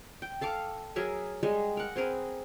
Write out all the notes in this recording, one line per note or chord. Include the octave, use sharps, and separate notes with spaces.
G5
A4 F5 A5 D6
F#3 G#4 A#4 E5
G3 G#3 G#4
A#4 F#5
C4 G#4 A#4 B4